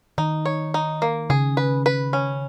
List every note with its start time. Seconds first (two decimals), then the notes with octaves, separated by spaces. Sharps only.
0.18 D#3 D#4
0.46 C#5
0.74 D#4
1.02 A#3
1.30 C#3 G#4
1.57 B4
1.86 B4
2.13 C#4